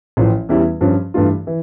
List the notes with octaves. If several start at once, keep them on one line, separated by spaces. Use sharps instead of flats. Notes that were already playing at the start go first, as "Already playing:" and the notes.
A1 A2 F3
E2 E3 G3 C#4 E4
G2 F3 C#4
G2 E3 A3 D4 F4
E3